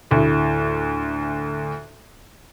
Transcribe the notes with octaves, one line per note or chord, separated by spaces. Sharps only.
D2 A2